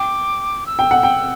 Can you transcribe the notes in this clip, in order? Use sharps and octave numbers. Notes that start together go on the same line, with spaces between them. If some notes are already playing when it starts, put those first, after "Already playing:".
Already playing: G5 D6
E6
G5
F#5
G5